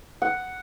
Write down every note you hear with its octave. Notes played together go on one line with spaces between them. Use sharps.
F#5